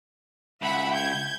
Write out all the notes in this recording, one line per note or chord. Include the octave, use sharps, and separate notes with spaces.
C#2 E5 F#5 B5
G6 G#6